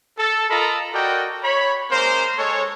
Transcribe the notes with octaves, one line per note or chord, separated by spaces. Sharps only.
A4
F4 A4 A#4 D#5 A#5 B5
F#4 A4 A#4 D5 D#5 G5
C#5 B5
G#3 A#3 C#4 A#4 C5
G#3 A4 C#5